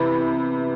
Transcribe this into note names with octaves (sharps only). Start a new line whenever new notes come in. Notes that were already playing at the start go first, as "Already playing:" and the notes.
Already playing: C3 E3 B3 B5